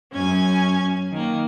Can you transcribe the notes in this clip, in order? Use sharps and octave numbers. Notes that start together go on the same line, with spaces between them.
F#2 C#4 G#5 G#6
D#3 A#3